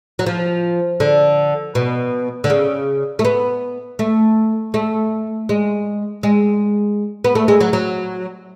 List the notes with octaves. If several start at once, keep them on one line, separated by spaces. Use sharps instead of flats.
F#3
F3
D3
B2
D3
C#3
A3
B3
A3
A3
G#3
G#3
B3
A3
G#3
F#3
F#3